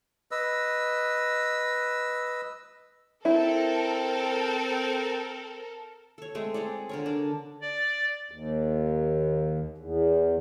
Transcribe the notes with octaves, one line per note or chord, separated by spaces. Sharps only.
B4 D#5 E6
C4 E4 A4 A#4
A4 C#5
G#3 A3 C4
C4 G#4 C#5 D5
D3 A#4 C#5
D4 A#4
D5
D#2
E2